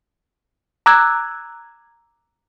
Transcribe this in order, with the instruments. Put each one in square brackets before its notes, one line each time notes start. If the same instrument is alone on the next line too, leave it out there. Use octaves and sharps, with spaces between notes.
[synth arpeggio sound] A#5 D6 E6 F#6 G#6